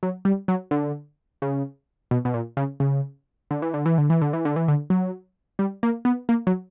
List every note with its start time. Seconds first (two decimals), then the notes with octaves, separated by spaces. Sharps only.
0.03 F#3
0.25 G3
0.48 F#3
0.71 D3
1.42 C#3
2.11 B2
2.25 B2
2.34 A#2
2.57 C#3
2.80 C#3
3.51 D3
3.62 E3
3.74 D3
3.86 E3
3.98 D3
4.10 E3
4.22 D3
4.33 E3
4.45 D3
4.56 E3
4.68 D3
4.90 F#3
5.59 G3
5.83 A#3
6.05 B3
6.29 A#3
6.47 F#3